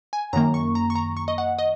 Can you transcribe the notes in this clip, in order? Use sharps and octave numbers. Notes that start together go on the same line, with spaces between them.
G#5
F#2 D#3 A#3 A#5
C#6
A#5
C#6
A#5
C#6
D#5
F#5
D#5